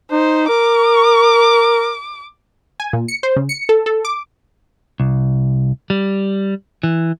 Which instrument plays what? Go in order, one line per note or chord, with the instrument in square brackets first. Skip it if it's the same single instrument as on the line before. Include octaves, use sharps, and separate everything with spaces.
[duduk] D#4 [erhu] C5
[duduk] A#4 [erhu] D6
[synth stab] G#5
A#2
C#7
C5
C#3
C#7
A4
A4
D6
[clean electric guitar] C2
G3
E3